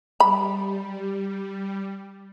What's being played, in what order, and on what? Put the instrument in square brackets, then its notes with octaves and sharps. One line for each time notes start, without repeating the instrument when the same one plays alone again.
[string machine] G3 [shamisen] B5